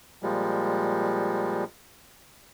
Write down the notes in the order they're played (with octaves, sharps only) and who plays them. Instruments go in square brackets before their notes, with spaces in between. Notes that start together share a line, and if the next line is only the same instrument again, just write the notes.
[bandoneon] A#2 F3 G3 G#3